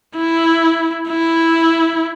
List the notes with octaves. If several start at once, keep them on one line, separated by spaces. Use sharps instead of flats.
E4
E4